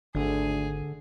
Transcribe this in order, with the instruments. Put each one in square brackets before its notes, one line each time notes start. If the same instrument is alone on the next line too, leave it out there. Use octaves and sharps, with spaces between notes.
[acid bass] G#1 [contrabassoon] D2 [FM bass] D3 [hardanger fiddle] G#4